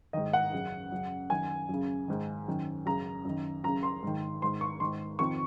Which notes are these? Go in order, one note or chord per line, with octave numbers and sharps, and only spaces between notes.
G#2 D#3 D#5
F#5
F#2 C#3
F#2 C#3
F#2 D#3 G#5
F#2 C#3
G#2 D#3
F#2 D#3
F#2 C#3 A#5
F#2 D#3
F#2 C#3 A#5
C6
G#2 D#3
G#2 D#3 C6
C#6
G#2 D#3 C6
F2 C3 D#3 C#6